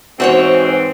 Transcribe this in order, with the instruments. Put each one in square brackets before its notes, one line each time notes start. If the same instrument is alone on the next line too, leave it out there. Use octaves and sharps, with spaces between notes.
[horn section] G#2 E3 C4 [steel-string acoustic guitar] F#4 C5 C#5